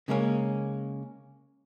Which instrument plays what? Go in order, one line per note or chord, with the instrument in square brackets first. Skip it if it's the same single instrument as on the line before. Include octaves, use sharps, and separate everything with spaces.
[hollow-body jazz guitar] C#3 G#3 A#3 C#4